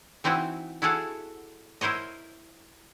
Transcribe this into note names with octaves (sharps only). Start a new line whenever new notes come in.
E3 C4 D#4 E4 F#4
E4 F#4 G#4 A4 F5 F#5
E4 A#4 C5 C#5 D#5